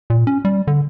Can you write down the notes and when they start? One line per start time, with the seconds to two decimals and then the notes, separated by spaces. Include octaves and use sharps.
0.10 A#2
0.27 C#4
0.45 G3
0.67 D3